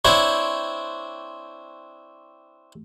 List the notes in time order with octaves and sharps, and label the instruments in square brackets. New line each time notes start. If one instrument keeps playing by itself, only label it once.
[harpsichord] C4 D4 E4 C#5